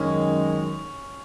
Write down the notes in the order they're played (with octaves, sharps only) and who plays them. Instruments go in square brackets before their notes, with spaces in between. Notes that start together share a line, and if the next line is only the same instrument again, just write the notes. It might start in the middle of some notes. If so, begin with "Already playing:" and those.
Already playing: [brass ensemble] F#2 D#3 G#3 [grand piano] C#4